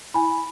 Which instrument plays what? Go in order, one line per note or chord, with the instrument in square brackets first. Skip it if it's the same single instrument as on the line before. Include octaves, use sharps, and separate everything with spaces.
[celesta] E4 G#5 B5